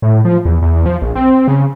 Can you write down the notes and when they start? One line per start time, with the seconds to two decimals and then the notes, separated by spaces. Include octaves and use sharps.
0.02 A2
0.25 F3
0.45 E2
0.62 E2
0.86 F3
1.02 A#1
1.15 C4
1.48 C#3